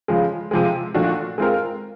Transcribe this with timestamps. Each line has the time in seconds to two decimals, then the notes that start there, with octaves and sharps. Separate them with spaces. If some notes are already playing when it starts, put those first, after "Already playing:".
0.08 C#3 F3 G#3
0.51 C3 F3 G#3
0.94 A#2 F3 A3 D4 F#4
1.38 G#3 C4 F4 A#4